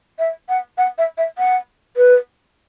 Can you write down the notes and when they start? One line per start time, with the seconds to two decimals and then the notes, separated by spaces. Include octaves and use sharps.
0.19 E5
0.49 F#5
0.78 F#5
0.98 E5
1.18 E5
1.38 F#5
1.97 B4